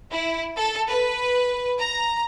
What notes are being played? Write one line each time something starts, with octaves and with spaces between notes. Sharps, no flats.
E4
A4
B4
A#5